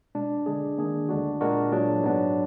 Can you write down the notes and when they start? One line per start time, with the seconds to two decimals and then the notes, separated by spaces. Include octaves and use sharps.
0.15 B2 G#3 D4
0.46 D3 G#3 D4 G#4
0.78 D#3 A#3 D4 G#4
1.09 D2 D3 G#3 D4 F#4
1.41 A#2 G#3 D4 F#4 A#4
1.72 A#2 F#3 D4 G#4
2.03 G#2 F#3 B3 D4